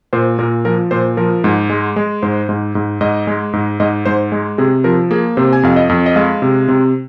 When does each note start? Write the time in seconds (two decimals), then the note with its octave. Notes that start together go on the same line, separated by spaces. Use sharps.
0.13 A#2 C5
0.39 A#2 A#4
0.65 F3 A#4
0.91 A#2 C5
1.17 F3 A#4
1.44 G#2
1.70 G#3
1.96 G#3
2.23 G#2 C5
2.49 G#2
2.75 G#2
3.01 G#2 D#5
3.27 G#3
3.53 G#2
3.80 G#2 D#5
4.05 G#2 C5
4.32 G#3
4.58 C3 G#4
4.84 F3 A#4
5.11 A#3 G#4
5.37 C3 C5
5.53 G#5
5.63 F2 F5
5.76 D#5
5.89 F2
6.06 D#5
6.16 G#3 F5
6.42 C3
6.68 C3